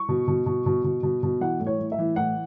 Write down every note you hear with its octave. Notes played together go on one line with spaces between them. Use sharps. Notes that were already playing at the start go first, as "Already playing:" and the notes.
Already playing: C#6
B2
B2
B2
B2
B2
B2
B2
E3 F#5
A2
C#5
A2
E5
E3
A2 F#5